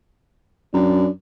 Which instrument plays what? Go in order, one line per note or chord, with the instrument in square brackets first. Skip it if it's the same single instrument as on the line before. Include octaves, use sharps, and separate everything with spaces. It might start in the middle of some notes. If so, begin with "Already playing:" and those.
[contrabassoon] F#2 [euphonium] D4